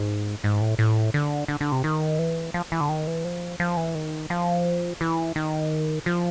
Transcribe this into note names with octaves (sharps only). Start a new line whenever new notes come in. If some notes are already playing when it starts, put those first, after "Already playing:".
Already playing: G#2
G#2
A2
A2
D3
D3
D3
C3
D#3
E3
F3
E3
D3
D#3
E3
F3
F3
E3
D#3
F3
E3
D#3
F3